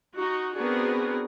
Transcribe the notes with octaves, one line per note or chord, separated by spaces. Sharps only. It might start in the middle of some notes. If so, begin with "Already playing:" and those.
D#4 F#4
B3 C4 D4 F#4 G#4 A#4